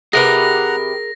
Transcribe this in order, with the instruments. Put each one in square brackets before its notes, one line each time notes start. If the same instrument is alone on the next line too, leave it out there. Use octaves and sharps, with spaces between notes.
[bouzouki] C3 G4 B4 [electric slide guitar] G#4 A#4 [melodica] F#5 A#5 [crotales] A#6